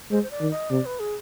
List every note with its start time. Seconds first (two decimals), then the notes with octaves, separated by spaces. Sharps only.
0.11 G#3 C5
0.23 C5
0.31 D5
0.41 D#3
0.51 D#5
0.70 C3 D5
0.85 B4
1.00 G#4